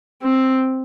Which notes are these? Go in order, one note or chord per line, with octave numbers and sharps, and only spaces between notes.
C4